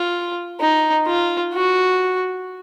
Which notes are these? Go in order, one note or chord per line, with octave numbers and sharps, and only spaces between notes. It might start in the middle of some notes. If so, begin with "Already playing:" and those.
Already playing: F4
D#4
F4
F#4